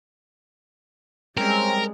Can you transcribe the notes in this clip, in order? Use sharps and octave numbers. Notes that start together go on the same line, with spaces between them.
G3 G#3 C4 C#4 A#4